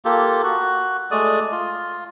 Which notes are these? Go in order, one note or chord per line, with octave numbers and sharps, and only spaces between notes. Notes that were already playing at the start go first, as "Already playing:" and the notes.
A#3 F4 G4 A4
F#4
G#3 A3 D5 D#6
F4